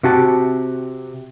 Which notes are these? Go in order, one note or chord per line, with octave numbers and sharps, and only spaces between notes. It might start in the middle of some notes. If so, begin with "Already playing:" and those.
C3 F#4 G4 A5